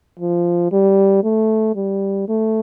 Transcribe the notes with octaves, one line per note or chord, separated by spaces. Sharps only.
F3
G3
A3
G3
A3